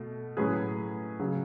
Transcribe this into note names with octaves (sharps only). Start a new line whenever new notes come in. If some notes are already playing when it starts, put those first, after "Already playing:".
Already playing: B2 A3
A2 F#3 C#4 G#4 B4
C#3 F#3